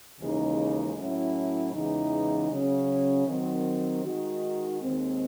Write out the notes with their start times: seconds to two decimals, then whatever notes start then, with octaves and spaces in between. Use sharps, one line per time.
0.20 D#2 C#3 E3 G#3 D#4
0.96 A2 F#3 C#4 E4
1.73 E2 C#3 E3 G#3 D#4
2.50 C#3 F#3 C#4
3.27 D#3 F#3 C4
4.03 D#3 G#3 D#4 F#4
4.81 D#2 D#3 G#3 C4